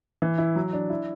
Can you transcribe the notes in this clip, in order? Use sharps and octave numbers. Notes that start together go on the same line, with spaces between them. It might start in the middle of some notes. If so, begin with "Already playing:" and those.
E3
E4
F#3
D4
E4